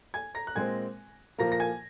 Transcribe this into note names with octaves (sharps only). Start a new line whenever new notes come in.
G#5 G#6
A#5 A#6
F#6
A#2 G#3 C4 G#5 G#6
A#2 F3 A#3 A#5 A#6
A#6
G#5 G#6